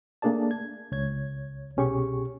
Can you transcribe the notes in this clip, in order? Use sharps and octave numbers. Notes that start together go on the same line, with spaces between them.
A3 A#3 D4 G#4 D5 A5
G#6
C#2 C#5 G#6
C2 B2 C#4 G4 G#4 C#6